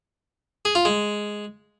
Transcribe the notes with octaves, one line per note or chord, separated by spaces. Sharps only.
G#4
F4
G#3